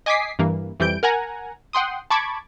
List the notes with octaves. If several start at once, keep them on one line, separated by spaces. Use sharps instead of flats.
D#5 G#5 D6 D#6 B6 C7
G2 E3 A#3
F2 E3 G3 G6 D7
A#4 F#5 G#5 A#5
F#5 G5 C6 D#6
A5 B5 C#6 D6 G#6